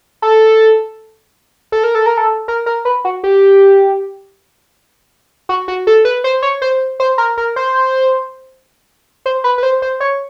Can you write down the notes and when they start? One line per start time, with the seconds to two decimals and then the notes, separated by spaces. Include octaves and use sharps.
0.22 A4
1.72 A4
1.84 A#4
1.95 A4
2.06 A#4
2.17 A4
2.48 A#4
2.66 A#4
2.85 B4
3.05 F#4
3.24 G4
5.49 F#4
5.68 F#4
5.87 A4
6.05 B4
6.24 C5
6.42 C#5
6.62 C5
7.00 C5
7.18 A#4
7.38 A#4
7.56 C5
9.26 C5
9.44 B4
9.58 B4
9.63 C5
9.82 C5
10.00 C#5